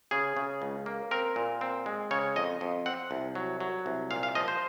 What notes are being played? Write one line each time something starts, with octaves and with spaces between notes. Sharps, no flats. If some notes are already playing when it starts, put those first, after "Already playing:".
C#3 G#4
C#3
C#2
A#3
C4 A#4
A#2
C4
G#3
C#3 C#5
F2 D#5
F2
C4 F#5
C2
F#3
F#3
C2
A#2 F5
F5
F3 D#5
C5